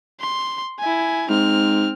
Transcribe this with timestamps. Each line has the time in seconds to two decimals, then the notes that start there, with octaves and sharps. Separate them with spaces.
0.21 C6
0.79 E4 G#5
1.30 G#2 C4 F6